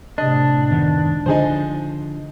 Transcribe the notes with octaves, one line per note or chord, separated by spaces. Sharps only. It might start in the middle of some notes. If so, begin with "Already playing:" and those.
A2 C3 D4 D#5
F#1 C#2 D#3 B3
D3 F3 D#4 G#4 C5